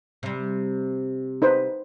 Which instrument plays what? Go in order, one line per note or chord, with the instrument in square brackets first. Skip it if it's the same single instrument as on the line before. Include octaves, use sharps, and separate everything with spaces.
[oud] C3 G3
[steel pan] D#4 B4 C5